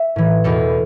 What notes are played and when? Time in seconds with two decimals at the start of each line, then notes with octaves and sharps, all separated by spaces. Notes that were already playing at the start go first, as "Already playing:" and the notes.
Already playing: E5
0.16 A2 E3
0.44 E2 B2 A4